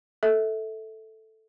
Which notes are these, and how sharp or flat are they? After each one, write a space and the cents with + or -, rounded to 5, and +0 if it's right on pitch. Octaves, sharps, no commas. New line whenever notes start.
A4 +0 E5 -25